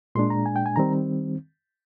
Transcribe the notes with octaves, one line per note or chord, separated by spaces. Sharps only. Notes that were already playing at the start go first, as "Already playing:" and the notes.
A#2 G#3 D4 C6
A#5
G#5
G5
G#5
D#3 G3 C4 A#5